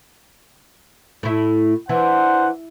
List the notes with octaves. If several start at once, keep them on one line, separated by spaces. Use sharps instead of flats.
A2 E4
E3 D4 C5 F#5